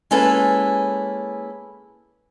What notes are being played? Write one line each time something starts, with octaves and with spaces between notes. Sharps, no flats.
G#3 A#3 C#4 E4 A4 B4